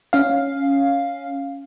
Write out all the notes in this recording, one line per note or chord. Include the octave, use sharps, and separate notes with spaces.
C#4 F5